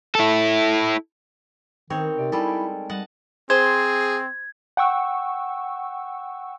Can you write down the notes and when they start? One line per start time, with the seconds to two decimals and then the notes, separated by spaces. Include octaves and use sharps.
0.15 E4 A4
1.90 D#3 B3 C4 D#4 A#4 C#5
2.18 C3 D5
2.32 G3 G#3 E4 A4
2.47 G#6 D7
2.89 G3 D#5 F#5 A5
3.50 C4 G#4 C5 G#6
4.77 F#5 G5 C#6 E6